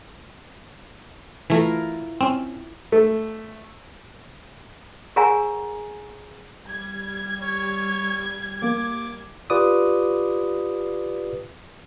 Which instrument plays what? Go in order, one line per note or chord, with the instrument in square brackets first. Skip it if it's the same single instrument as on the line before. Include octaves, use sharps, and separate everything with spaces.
[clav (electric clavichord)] E3 A3 [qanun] E4 F4 A#4
[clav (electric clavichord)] C4 C#4
[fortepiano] A3
[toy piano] G#4 A#4 C#5 F#5 G#5 A#5
[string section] G3 G#6
[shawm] C#5
[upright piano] A#3 [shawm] D6
[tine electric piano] F4 G4 B4 D5 D6 D#6